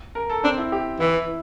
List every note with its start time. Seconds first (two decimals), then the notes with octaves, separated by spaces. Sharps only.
0.15 A#4
0.29 A4
0.44 C4 D4
0.58 E4
0.72 G4
1.00 E3 E4